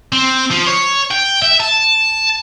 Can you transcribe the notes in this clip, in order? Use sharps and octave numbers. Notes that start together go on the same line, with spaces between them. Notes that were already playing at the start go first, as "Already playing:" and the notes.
C4
F3
C#5
G5
E5
A5